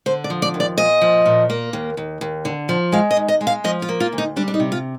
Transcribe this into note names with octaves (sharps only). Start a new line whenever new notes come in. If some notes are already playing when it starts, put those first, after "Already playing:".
D3 C5
D5
F3
D5
D#2
D5
A#2 D#5
F3
A#2
A#3
D#2
D#2
D#2
D3
F3
G#3 F5
D#5
D#2
D#5
G#3
F5
F3 D#5
F4
A#3
F4
D2
D#4
G3 D4
D4
D#4
C3
F4